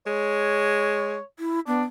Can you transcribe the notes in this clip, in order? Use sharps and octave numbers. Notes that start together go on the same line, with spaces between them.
G#3 C#5
E4
B3 D4